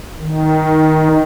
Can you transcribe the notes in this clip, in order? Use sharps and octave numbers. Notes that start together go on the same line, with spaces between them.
D#3